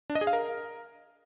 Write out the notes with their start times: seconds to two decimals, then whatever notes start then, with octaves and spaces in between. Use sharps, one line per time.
0.10 D4
0.15 D#5
0.21 G#4
0.27 F5
0.33 A#4